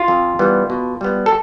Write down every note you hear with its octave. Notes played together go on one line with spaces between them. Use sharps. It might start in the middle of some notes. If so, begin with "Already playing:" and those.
Already playing: F4
F2
E3 G3 B3
B2
G3 B3
A4